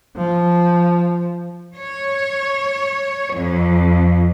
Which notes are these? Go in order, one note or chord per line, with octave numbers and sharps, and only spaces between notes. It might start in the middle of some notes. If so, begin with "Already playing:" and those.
F3
C#5
F2